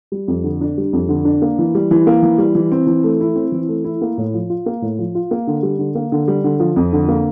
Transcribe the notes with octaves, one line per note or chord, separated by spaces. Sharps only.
G3
F2
D3
D4
G3
F2
D3
D4
A#3
E3
G3
E3
A#3
E3
G3
E3
C4
E3
A3
E4
C4
E3
A3
E4
A#3
A2
F3
F4
A#3
A2
F3
F4
A#3
D3
G3
D3
A#3
D3
G3
D3
F3
F2
D3
A#3